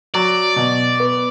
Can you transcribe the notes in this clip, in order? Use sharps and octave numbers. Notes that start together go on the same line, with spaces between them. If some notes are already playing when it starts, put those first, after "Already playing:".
F#3 D5
B2
B3